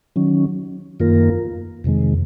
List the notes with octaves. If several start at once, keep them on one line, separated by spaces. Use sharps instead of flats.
D#3 F#3 C#4
F#2 D#3 A#3 F4 A#4
F2 C3 D#3 G#3